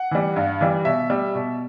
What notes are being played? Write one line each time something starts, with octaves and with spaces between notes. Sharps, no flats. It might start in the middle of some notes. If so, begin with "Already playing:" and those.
Already playing: F#5
E3 G3
G2
E3 G3
B2 E5
G3
B2